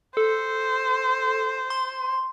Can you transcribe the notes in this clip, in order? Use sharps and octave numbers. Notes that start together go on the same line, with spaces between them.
A4 C5
C6